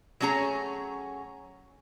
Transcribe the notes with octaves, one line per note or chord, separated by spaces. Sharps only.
F#3 A3 C#4 G#4 A#5